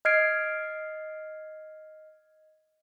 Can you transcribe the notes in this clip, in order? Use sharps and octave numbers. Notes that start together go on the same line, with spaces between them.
D#5 F6 G#6 C7 D7